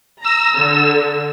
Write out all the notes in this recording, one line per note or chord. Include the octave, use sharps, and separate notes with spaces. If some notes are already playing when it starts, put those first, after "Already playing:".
A#5 E6
D3